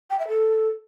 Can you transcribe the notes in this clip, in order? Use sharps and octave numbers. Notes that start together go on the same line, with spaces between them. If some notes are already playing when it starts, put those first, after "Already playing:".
G5
E5
A4